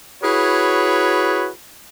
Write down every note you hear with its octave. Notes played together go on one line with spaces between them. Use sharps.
E4 F#4 G#4 B4 C#5